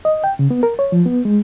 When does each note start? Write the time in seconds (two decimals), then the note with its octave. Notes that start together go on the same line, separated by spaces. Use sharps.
0.05 D#5
0.24 G5
0.39 C#3
0.51 B3
0.63 A#4
0.79 C#5
0.92 F3
1.06 B3
1.25 G#3